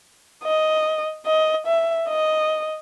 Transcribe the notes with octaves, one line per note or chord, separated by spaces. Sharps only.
D#5
D#5
E5
D#5